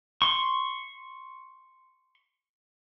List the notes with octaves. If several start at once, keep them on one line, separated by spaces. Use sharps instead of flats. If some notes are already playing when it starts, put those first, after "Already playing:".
C6 C#6